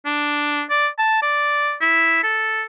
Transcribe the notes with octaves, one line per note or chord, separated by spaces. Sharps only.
D4
D5
A5
D5
E4
A4